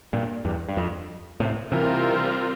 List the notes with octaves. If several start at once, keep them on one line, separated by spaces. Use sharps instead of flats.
G2 A#2
E2 G2
G2
F2
A2 C3
C3 E3 G3 C4 F4 A#4